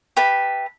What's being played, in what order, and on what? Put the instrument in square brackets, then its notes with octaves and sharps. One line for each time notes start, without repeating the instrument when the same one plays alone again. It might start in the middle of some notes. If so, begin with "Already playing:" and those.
[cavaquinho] G4 B4 E5 A5